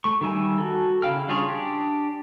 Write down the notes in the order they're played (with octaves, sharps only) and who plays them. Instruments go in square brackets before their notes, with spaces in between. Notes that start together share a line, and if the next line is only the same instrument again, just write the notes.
[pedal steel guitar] A3 C#6
D#3 G3 E5 G#5
F#4 A4
C#3 E4 F5 G5 F6
G3 D4 F4 G#4 C#5
D4 G4